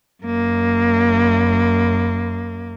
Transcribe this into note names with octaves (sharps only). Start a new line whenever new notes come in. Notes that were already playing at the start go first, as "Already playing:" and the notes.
F#2 A#3